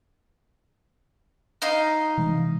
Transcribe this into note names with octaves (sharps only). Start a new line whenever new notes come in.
D#4 D#5 F5
C3 E3 G#3